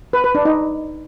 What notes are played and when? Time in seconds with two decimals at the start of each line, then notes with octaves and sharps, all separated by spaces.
0.13 B4
0.24 B4
0.35 D4
0.45 D#4